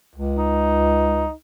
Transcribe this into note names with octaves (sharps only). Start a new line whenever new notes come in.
C#2
D#4